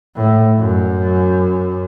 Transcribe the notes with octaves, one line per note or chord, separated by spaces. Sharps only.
A2
F#2